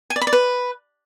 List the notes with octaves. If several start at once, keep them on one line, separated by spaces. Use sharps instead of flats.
G#5
D5
B5
D5
B4